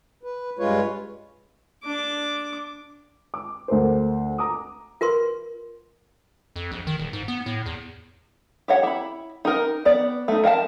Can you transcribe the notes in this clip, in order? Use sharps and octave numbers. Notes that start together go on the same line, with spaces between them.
B4
G2 G#3 F4 B4 C#5
D4 D6
D6
D2 A#4 C5
A#5 D6 D#6
F4 A#4 B4 C6
F2
A#1
D#3
D#1
G#2
B3
A2
E2
G4 C#5 F#5
E4 B5
D#4 A#4
B3 D5
A3 D#4
A#4 F5 G#5 A5